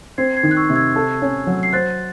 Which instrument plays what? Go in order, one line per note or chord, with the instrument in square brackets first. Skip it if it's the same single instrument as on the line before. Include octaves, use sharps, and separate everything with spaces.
[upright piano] C4 [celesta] G#6 C7
[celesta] G#6 C7
[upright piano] D#3
[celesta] F#6
C#6 E6
[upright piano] C3
[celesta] E6 G#6
[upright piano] A4
C#4
F#3
[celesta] C7
[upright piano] C5 [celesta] F#6 A6